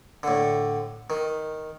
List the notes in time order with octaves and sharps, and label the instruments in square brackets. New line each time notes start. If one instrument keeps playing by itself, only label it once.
[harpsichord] A2 D3
D#3